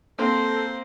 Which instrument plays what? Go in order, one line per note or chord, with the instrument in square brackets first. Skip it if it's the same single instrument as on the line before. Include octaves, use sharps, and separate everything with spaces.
[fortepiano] A#3 C4 [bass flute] A4 [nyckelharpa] C5